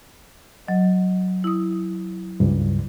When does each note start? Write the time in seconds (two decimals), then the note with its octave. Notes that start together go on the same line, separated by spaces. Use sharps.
0.67 F#3 D#5
1.44 E4 D#6
2.40 C#2 G2